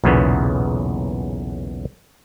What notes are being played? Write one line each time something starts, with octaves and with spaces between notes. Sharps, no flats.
B1 E2 A#2 C#3 B3